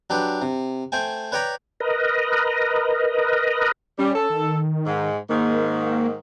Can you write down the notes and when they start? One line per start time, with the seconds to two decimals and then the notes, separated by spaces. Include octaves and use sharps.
0.10 F#3 D4 G4 B4
0.42 C3
0.92 A3 C5 G5 G#5
1.32 B4 C#5 D5 G5 A#5 B5
1.80 A#4 B4 D#5
3.99 G3 C#4
4.15 A4
4.30 D#3
4.86 G#2
5.29 G#2 D#3 A#3